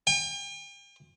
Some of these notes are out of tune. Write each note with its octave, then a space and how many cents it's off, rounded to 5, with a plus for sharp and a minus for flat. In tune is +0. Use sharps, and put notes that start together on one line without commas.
G5 +45